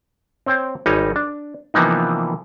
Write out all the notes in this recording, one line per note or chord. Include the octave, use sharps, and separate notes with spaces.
C4 C5 C#5 G5
G#1 G3 D#4 C#5 G#5
D4
C3 E3 F3 A#3 B3 D#4